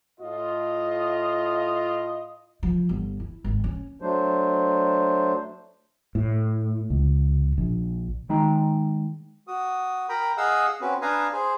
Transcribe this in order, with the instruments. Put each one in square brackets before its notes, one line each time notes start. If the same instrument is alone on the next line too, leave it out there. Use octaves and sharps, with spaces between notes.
[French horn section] A2 F4 [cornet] D#5
[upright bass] F3
G1
E4
G#1
C#4
[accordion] F#3 A3 D4 C5
[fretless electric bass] A2
C#2
A#1
[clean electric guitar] D#3 G#3 D#4 G5 A#5
[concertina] F#4 D#6
A#4 G5 A#5 B5
G#4 D#5 F5 F#5 D#6 E6
C4 C#4 F#4 B4
D4 B4 F5 G#5 A#5 D#6
G#4 C5